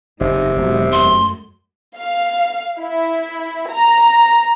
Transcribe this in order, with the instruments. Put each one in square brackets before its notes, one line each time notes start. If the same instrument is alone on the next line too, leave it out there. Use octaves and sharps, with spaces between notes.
[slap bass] F#1 E2 [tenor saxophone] C3 [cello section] D#4
[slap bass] E1 D#3 [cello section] G#2 B2 F#3
[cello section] F#2 G#3 A3 [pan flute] C6
[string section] F5
E4
A#5